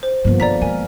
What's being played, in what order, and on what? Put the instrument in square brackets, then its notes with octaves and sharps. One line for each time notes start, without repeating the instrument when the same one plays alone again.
[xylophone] C5
[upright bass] G2 C#3 [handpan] F3 A#3 B3
[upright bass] D3 [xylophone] D5 A#5 B6
[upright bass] G#3 [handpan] A#4 [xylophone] G#5